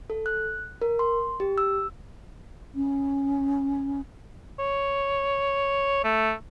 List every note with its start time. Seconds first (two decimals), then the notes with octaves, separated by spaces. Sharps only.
0.10 A4
0.26 F#6
0.82 A#4
0.99 C6
1.40 G4
1.58 E6
2.75 C#4
4.59 C#5
6.04 A3